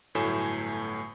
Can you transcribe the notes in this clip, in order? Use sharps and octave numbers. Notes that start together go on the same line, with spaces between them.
G1 A2 F#3 A3 G#5 E7